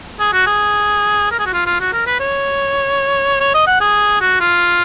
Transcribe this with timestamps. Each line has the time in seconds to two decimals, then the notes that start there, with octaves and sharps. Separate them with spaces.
0.20 G#4
0.33 F#4
0.47 G#4
1.32 A#4
1.39 G#4
1.46 F#4
1.53 F4
1.67 F4
1.81 F#4
1.93 A#4
2.07 B4
2.20 C#5
3.41 C#5
3.54 D#5
3.67 F#5
3.81 G#4
4.21 F#4
4.40 F4